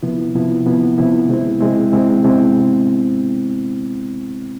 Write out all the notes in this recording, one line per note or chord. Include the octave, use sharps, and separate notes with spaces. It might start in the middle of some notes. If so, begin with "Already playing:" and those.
C3 F3 B3 E4
C3 F3 B3 E4
C3 F3 B3 E4
C3 F3 B3 E4
C3 G#3 C4 E4
C3 G#3 C4 E4
C3 G#3 C4 E4
C3 G#3 C4 E4